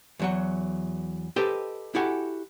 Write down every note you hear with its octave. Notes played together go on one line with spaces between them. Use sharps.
E2 F#3 F#5
G4 A4 B4 C5 D#5 G5
E4 F#4 G4 A4 F#5 G#5